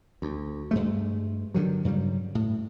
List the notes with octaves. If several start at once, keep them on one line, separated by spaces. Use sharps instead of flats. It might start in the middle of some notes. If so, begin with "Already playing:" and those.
D2
G2 G#3 A3
G2 D3 D#3 F#3
G2 C#3 F#3 G3
A2